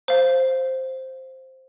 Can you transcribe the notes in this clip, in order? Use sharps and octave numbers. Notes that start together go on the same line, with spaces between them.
C5 F5